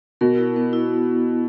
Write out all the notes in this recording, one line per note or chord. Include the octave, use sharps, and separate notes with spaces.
B2 A#4
E4
B3
E4